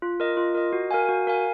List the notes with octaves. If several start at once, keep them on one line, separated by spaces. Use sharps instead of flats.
F4
A#4 D#5
F4
A#4 D#5
F#4
A#4 F5 G#5
F#4
A#4 F5 G#5